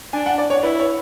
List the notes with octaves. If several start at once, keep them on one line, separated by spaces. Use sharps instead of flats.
D4 G#5
F#5
D5
C#5
E4 B4
C#5